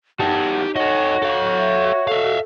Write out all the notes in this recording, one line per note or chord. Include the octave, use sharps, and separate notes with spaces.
E2 D#4 F#4 G4 A5
F#4 A4 C#5 D#5
A4 F5
E5
A4 E5 F5